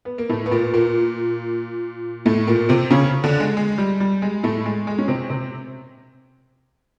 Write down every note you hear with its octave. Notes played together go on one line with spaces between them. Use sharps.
B3
A#3
A2 A3
B3
A#2 A#3
A#2 A#3
A2 A3
A#2 A#3
C3 C4
C#3 C#4
D3 D4
G#3
G#3
G3
G3
G#3
A2 A3
G#3
G#3
C#4
C3 C4
C3 C4